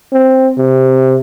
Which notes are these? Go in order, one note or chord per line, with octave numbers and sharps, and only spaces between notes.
C4
C3